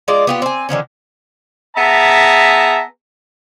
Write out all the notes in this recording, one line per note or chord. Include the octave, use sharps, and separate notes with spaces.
G#3 D#4 F4 D5
B3 F4 G4
C4 G#5
D3 D#3 F3 C#4
B3 G#4 E5 A5 A#5